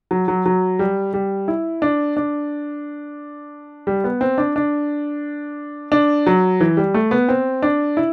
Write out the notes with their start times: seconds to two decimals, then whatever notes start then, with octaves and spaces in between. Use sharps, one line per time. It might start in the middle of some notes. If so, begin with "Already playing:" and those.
0.11 F#3
0.28 F#3
0.46 F#3
0.79 G3
1.14 G3
1.48 E4
1.82 D4
2.17 D4
3.87 G3
4.04 B3
4.21 C4
4.38 D4
4.56 D4
5.92 D4
6.27 F#3
6.60 E3
6.77 G3
6.94 A3
7.11 B3
7.29 C4
7.62 D4
7.97 E4